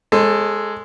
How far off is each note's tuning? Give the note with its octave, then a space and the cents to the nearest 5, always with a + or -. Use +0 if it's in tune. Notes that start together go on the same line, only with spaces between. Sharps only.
G#3 +0 A4 +10 C#5 -45